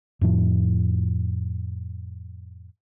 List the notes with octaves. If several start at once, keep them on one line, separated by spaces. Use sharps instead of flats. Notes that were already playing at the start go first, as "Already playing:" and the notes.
F2 A2 F3